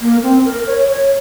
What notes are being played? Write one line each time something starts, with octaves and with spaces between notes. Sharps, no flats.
A#3
C4
A#4
C#5
C#5